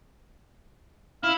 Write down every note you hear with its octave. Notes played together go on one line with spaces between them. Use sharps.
E4 F5